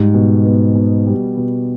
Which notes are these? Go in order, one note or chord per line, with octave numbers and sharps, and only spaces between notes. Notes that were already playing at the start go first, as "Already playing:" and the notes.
Already playing: G#2 G3
B2
B3
B2
G3
B2